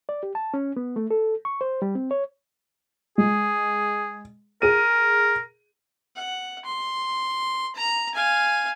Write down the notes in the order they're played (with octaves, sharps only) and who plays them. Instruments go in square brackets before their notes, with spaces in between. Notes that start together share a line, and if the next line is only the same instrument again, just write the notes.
[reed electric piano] D5
G4
A5
C#4
B3
A3
A4
C#6
C5
G3
C4
C#5
[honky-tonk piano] G#3 [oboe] G#4
[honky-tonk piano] G#4 D#7 [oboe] A#4
[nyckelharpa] F#5
C6
A#5
F5 G#5